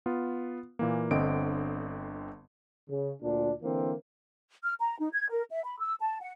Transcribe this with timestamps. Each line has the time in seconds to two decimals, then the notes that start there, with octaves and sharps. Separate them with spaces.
0.06 B3 F4
0.79 A#2 E3 A#3
1.11 G1 D3 C4 D#5 D7
2.88 C#3
3.22 D2 A#2 D4
3.62 D3 E3 A#3 C4
4.63 F6
4.80 A#5
4.99 D#4
5.13 G#6
5.30 A#4
5.50 E5
5.64 B5
5.80 E6
6.00 A5
6.20 F#5